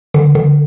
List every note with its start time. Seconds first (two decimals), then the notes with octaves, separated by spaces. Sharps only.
0.14 D3
0.35 D3